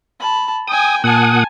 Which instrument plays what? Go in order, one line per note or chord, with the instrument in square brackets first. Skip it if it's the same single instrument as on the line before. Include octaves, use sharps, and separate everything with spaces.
[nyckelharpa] A5 B5
[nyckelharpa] G5 G#5 [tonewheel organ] D#6
[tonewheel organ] A#2 F#5 D#6 [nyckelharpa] G#5 A5